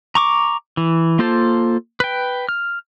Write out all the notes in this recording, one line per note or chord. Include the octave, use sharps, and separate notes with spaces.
A#5 C#6 D6
E3
A#3 F4 A4 C5 A5
B4 G5
F6